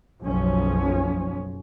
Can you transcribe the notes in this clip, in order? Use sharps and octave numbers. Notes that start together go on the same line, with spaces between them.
F#1 B1 F3 C#4